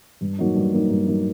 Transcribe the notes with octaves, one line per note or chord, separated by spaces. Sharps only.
G2
F#3 A#3 D#4
G2
F#3 A#3 D#4
G2
F#3 A#3 D#4